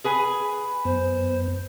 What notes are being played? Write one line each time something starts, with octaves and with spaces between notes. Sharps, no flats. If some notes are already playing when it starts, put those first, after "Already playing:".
G#4 B4 G#5
F#2 B3 C5